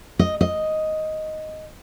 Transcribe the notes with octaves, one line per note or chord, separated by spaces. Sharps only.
D#5
D#5